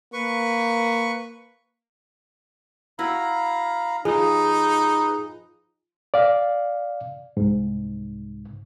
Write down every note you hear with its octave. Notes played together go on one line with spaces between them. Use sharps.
A#3 B4 C#6
E4 F#4 B4 F5 A#5 B5
F3 D#4 G#4 B4 D#5
D5 F5
C2 G#2